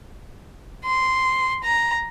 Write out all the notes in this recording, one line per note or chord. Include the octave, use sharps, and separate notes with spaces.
C6
A#5